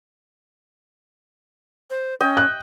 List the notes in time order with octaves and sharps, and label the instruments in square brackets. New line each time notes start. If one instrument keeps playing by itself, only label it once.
[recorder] C5
[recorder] C#4 [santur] D#5 G5
[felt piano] F#6